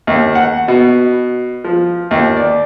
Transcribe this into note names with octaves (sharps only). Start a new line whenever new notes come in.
D#2
F#5
B2
F3
D#2
D5